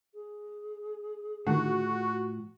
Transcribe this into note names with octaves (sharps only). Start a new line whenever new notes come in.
G#4
A2 D3 D#3 F3 F#4